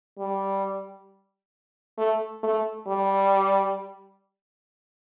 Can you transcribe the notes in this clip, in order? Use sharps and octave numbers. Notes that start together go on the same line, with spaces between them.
G3
A3
A3
G3